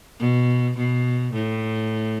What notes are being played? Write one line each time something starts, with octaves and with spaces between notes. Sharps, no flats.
B2
B2
A2